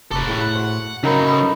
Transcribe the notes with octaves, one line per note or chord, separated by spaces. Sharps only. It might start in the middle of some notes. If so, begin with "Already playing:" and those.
F1 A4 B4 C#6 D6
A2 G#4
F#5
F#4 C5 C#6
C#3 F#3 C#4 D#4 A#4 B5
A4 B4 B5